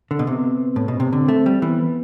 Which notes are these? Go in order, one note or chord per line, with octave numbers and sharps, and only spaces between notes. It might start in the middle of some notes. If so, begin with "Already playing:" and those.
D3
B2
C3 B3
A2
B2
C3 C4
D3
A3
G3
E3 B3